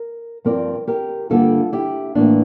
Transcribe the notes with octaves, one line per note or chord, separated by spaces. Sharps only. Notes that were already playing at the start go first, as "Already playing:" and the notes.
Already playing: A#4
G2 F3 C4 A#4 D5
G4 A#4
G2 D3 G3 A#3 F4 A4
E4 G4
A2 E3 A#3 D4